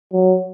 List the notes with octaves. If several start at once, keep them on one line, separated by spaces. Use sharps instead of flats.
F#3